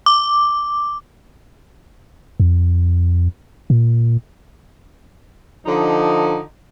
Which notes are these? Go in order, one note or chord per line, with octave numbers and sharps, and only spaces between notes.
D6
F2
A#2
D3 F3 D#4